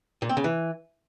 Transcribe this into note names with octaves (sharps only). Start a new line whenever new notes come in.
A#2
C4
C#3
E3